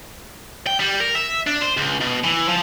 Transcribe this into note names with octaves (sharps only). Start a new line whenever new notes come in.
G5
G3
A#4
E5
D4
C5
C#2
B2
E3
F3